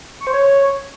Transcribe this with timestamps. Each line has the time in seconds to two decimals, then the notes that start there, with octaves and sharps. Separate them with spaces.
0.21 C#6
0.27 C5
0.33 C#5